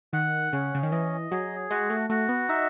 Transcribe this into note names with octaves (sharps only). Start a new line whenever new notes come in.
D#3 F#5
C#3 C#4
C#3
D#3
E3 D#5
F#3 G#4
G#3 F#4
A3
A3 F#4
B3
D#4 E5